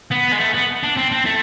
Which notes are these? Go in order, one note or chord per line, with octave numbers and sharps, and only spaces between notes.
B3
G#3
A3
B3
D4
C4
C4
A3